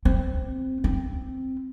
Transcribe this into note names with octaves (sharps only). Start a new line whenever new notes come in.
C4
C4